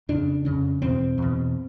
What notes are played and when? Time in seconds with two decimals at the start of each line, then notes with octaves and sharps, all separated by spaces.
0.09 F2 C#3 D4
0.45 F2 C#3 C#4
0.82 E2 B2 C4
1.18 E2 B2